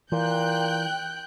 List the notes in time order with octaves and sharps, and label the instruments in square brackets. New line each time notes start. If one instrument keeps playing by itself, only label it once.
[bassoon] A#2 [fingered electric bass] E3 [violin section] G5 F#6 G6